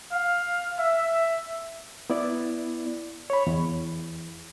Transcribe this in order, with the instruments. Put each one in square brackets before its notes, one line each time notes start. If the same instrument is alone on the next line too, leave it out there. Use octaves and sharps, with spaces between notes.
[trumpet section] F5
E5
[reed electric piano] B3 E4 D5
C#5 B5
E2